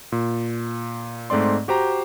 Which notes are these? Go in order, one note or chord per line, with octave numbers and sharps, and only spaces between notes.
A#2
G#2 A3 C4 D5 C6
F#4 G4 C5 A#5